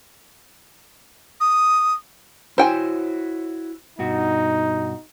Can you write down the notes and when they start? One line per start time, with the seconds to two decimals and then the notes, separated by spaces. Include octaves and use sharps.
1.41 D#6
2.58 E4 F#4 C5 C#5 G5 G#5
3.99 G2 B2 D#4 F#4